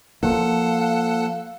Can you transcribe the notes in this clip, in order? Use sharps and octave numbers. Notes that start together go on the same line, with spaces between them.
F3 A#3 A4 F5 F#5